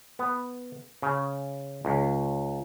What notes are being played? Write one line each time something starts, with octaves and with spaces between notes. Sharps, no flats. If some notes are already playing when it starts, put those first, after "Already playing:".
B3
C#3
C#2